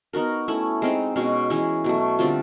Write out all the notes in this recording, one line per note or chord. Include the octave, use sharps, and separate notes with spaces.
B3 D#4 F#4 A#4
A3 C#4 E4
G#3 C4 D#4
B2 G#3 C#4 F#4
E3 G#3 C#4 E4
B2 F#3 A3
D3 G3 C4 F4